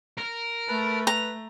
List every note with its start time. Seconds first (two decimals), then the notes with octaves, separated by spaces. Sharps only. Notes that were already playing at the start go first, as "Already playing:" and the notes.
0.18 A#4
0.69 A3 B4 A5 B5
1.07 B4 A#5